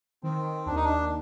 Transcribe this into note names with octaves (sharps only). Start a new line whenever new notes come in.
D#3 C4
D#2 D4
D#4
D4